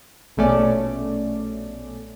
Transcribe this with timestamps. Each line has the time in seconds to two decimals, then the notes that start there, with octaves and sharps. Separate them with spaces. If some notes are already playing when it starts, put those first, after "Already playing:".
0.37 A#1 B2 A3 C#4 D5